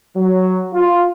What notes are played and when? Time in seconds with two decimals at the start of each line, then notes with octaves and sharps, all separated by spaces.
0.16 F#3
0.74 F4